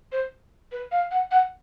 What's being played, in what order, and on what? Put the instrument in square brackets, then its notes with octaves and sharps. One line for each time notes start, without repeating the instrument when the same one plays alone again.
[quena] C5
B4
F5
F#5
F#5